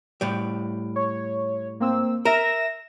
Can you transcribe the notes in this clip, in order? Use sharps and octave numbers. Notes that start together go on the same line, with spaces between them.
A2 G3
C#5
A#3 C4 E6
A#4 E5 A#6 E7